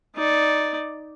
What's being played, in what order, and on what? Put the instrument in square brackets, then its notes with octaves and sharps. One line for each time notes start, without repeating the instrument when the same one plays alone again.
[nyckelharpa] D#4 D5